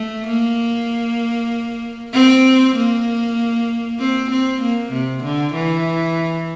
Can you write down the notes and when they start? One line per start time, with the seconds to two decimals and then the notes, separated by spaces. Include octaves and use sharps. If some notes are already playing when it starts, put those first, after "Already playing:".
Already playing: A3
0.27 A#3
2.14 C4
2.76 A#3
3.99 C4
4.31 C4
4.62 A#3
4.92 C3
5.24 D3
5.54 E3